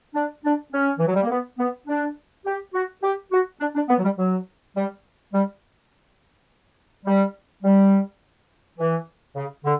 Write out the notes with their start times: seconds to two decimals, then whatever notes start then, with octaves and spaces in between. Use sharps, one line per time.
0.15 D4
0.44 D4
0.72 C#4
0.99 E3
1.07 F#3
1.14 G3
1.22 A#3
1.30 B3
1.58 B3
1.87 D4
2.45 G4
2.74 F#4
3.03 G4
3.32 F#4
3.60 D4
3.75 D4
3.89 B3
3.98 F#3
4.03 G3
4.18 F#3
4.76 G3
5.33 G3
7.06 G3
7.63 G3
8.79 E3
9.36 C#3
9.65 D3